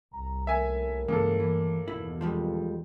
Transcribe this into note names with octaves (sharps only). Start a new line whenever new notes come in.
C2 A#5
D#2 A2 A#4 E5 G#5
G2 C#3 E3 G#3 A#3 A4
E3
E2 B2 D#3 E4
F2 F3 G3 G#3